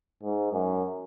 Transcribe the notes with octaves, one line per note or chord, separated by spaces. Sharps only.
G#2
F#2